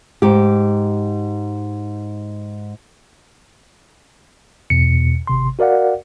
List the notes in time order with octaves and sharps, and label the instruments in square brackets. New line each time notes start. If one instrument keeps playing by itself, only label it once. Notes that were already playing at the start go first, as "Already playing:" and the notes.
[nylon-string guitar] G#2 G4
[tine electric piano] E2 B2 C#7
G#1 C3 C6
F#4 A#4 D5 F5 F#5